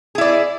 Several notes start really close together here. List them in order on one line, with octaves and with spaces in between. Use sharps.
G#4 E4 D5